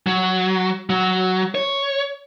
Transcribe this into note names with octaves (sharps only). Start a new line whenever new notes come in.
F#3
F#3
C#5